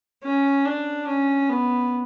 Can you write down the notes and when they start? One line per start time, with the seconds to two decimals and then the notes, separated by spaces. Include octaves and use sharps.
0.24 C#4
0.65 D4
1.07 C#4
1.49 B3